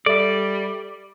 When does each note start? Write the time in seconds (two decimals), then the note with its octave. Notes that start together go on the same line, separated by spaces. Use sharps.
0.06 G3 A4 D5 E5